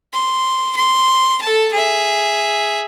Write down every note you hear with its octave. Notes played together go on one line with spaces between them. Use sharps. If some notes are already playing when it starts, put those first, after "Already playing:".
C6
C6
A4 A5
G#4 E5